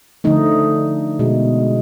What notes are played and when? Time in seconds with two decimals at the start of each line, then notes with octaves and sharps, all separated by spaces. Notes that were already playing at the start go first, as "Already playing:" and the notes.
0.24 D3 F3 A3 D#4
1.19 B2 G#3